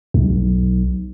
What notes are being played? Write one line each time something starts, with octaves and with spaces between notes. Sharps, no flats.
B1